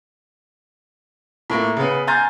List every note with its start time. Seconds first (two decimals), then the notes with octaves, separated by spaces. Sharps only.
1.50 A2 A#3 F4
1.77 C#3 B3
2.07 G#5 A#5 C6 F6 G6 A6